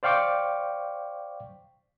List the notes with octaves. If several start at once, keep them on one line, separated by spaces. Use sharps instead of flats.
C5 D5 F5 G5 C#6 D6